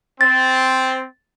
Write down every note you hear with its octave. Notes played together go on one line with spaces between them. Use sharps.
C4 A6